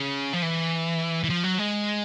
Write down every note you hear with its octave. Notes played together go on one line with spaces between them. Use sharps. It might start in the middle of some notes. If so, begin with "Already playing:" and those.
Already playing: C#3
F3
E3
E3
F3
F#3
G#3